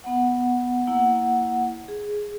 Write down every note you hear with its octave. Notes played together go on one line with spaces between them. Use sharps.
B3 F#5
A#3 E4 F#5
G#4